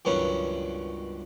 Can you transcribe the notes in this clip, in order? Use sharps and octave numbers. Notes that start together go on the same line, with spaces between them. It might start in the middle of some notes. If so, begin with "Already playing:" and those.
C#2 G2 D#3 F#3 B3 C#4